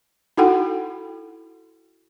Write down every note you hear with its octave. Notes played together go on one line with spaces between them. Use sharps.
D#4 E4 F#4 A4 F#5 G5